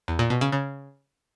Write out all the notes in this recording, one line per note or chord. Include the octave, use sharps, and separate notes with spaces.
E2
A#2
B2
C#3
C#3